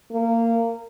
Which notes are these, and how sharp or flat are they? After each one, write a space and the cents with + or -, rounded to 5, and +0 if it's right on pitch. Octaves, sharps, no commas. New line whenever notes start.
A#3 -20